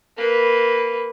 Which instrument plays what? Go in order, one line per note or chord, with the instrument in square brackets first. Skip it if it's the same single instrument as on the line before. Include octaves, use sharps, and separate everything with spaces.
[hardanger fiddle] A#3 B4